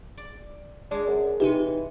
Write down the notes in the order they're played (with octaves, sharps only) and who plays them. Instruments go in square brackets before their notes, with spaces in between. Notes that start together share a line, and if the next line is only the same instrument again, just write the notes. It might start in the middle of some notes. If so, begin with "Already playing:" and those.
[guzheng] D5
[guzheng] G#3 G#4 [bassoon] D4
[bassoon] F#2
[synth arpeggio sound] C3 D#4 G4 [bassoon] E3